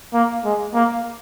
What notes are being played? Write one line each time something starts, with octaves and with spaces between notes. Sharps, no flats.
A#3
G#3
A#3